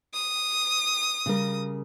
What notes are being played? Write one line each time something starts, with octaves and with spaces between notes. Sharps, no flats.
D#6
C#3 G3 A#4